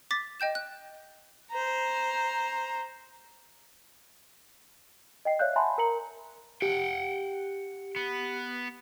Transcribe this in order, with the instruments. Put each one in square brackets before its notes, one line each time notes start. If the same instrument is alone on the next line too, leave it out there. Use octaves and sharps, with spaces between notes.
[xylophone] D6 A6 B6
D#5 G5 G6 E7
F#6
[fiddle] C5 A#5
[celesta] D#5 G5 C7
C#5 D5 E5 F5 F#6 G6
E5 F#5 G#5 A5 B5 C6
A#4 A#5 C#7 F#7
[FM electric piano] G4 [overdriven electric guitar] F#5 G5
[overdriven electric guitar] B3